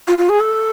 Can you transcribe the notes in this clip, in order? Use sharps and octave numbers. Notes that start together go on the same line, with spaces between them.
F4
F4
G#4
A4